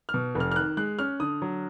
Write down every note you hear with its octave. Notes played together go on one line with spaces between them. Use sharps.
F6
B2
F1
F6
F6
D#3 F#6
G#3 F#6
C#4 F6
D3 D#6
F#3